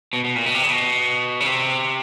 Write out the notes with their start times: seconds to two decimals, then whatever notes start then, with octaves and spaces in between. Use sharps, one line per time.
0.13 B2
0.24 B2
0.36 A#2
0.46 B2
0.54 C3
0.63 C#3
0.70 B2
1.40 C#3
1.46 C3